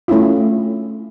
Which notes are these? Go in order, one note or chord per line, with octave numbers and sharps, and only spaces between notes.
A3 C#4 D4 E4 F4